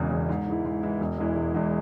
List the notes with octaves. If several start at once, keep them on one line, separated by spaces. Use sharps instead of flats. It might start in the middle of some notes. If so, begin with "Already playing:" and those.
Already playing: E1 E2 C#3 G#3
E2 C#3 G#3
G#2
E3 G#3 E4
G#2
E3 G#3 E4
E1
E2 E3 G#3 E4
E1
E2 E3 G#3 E4